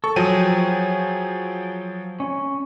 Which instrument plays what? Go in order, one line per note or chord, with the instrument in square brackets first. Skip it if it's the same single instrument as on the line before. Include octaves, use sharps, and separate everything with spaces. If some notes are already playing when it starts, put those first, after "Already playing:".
[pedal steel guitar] A4 [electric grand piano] C#6
[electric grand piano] F3 F#3 D#7 [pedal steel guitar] G#4 G5
[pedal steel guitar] C#4